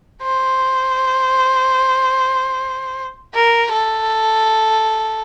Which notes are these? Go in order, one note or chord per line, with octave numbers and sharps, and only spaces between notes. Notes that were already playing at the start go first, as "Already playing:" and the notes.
C5
A#4
A4